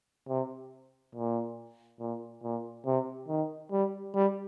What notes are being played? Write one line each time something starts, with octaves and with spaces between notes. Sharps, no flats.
C3
A#2
A#2
A#2
C3
D#3
G3
G3